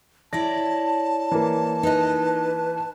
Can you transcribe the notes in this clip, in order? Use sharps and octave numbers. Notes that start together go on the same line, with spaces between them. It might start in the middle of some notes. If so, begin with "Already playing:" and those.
E4 C#5 D5 A5 A#6
E3 A#3
D#4 B4 D#5